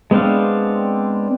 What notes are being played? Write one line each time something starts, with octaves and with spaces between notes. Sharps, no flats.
G#3 B3 C4 D4 F5